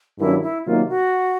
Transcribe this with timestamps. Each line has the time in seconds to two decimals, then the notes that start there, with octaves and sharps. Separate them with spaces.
0.19 G2 D#3 F#3 A#3 C#4 E4
0.42 E4
0.66 C3 D#3 F#3 A#3 D#4 F4
0.89 F#4